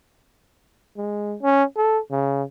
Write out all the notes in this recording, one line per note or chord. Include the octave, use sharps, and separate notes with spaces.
G#3
C#4
A4
C#3